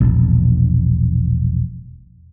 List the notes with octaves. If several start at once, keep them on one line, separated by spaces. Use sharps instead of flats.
E1 A#1